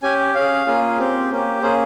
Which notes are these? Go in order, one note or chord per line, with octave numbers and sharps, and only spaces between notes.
C#4 G4 G#5
C#4 G#4 F5
A#3 C#4 F4 G#4
C4 G4
A#3 C#4 G4
A#3 C#4 G#4 C5